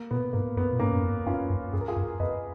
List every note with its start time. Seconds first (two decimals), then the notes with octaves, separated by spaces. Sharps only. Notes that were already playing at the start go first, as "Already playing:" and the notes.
Already playing: A#3
0.11 A#2 B3
0.33 G#2 A#3
0.56 F#2 B3
0.73 A#2
0.79 G#2 A#3 C#4
0.92 F#2
1.03 F2
1.26 F#2 C#4 F4
1.50 F#2
1.73 F#2 G#4
1.81 A#4
1.88 F4 G#4
1.96 F#2
2.20 F2 B4 D#5